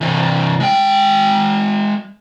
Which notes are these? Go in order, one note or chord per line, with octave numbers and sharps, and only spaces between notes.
C3 E3
G#3 G5